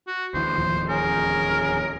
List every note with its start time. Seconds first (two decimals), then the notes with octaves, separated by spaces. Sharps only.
0.07 F#4
0.34 D2 E3 C5
0.58 D1 D#2 F3
0.89 C#4 G#4 A#4